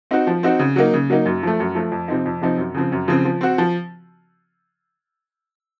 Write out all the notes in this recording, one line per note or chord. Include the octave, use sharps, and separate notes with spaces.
C4 D#4 F#4
F3
C4 D#4 F#4
C#3
F#3 A#3 D#4
C#3
F#3 A#3 D#4
F#2
F3 A3
F#2
F3 A3
F2
C3 F3 C4 D#4
F2
C3 F3 C4 D#4
F#2
C#3 F3 C4
F#2
C#3 F3 C4
F3
C4 F#4
F3